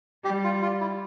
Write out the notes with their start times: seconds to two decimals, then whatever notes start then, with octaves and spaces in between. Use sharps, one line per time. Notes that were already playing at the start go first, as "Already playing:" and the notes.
0.24 G3 G4
0.44 F4
0.62 F4
0.81 E4